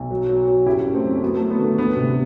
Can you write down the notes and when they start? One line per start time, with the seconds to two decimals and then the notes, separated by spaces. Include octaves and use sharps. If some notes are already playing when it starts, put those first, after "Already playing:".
Already playing: B1
0.11 F#3
0.29 F#3
0.48 F#3
0.66 F#1 E4 G4
0.85 F#2
0.94 A3 C4
1.04 F#2
1.22 F#3 B3
1.36 A3
1.41 F#3
1.50 B3
1.59 D3 A3
1.78 D2 B3
1.96 C3